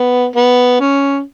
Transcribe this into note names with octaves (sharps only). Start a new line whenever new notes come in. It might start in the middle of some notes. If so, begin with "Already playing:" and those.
Already playing: B3
B3
C#4